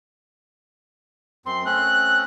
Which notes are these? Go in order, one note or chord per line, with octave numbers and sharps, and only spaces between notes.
F#2 C4 C6
A3 C4 C#4 F#6